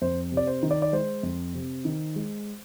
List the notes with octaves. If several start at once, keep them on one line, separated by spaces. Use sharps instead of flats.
F2 C5
C3
D5
C5
D#3
D5
D5
G#3 C5
F2
C3
D#3
G#3